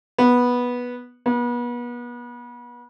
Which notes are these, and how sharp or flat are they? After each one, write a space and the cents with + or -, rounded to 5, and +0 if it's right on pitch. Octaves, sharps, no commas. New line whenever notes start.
B3 -10
B3 -35